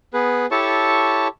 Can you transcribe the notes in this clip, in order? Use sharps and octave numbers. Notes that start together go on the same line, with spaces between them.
B3 G#4 B4
E4 G4 A4 C#5 A5 C#6